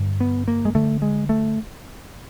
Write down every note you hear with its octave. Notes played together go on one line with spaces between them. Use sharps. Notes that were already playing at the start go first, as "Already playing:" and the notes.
Already playing: G2 D3
B3
A#3
G#3
G2 D3 A3
G#3
A3